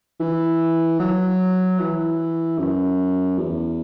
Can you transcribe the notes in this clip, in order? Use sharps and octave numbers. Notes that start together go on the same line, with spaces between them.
E3
F#3
E3
F#2
E2